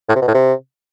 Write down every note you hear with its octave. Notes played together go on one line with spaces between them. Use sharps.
A2
C3
B2
A2
C3